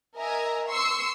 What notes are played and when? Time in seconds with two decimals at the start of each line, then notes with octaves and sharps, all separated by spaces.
0.15 A#4 D#5 E5 G#5 A#5
0.67 C6 C#6 E6 C7 C#7